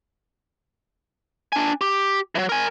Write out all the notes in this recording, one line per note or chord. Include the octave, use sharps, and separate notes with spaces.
D4 G#5
G4
E3 F#3
A#4 G#5